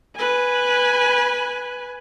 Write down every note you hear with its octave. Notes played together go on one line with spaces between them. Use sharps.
B4 G#5